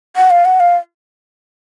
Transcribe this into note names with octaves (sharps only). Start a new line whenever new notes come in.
F#5
F5
F#5
F5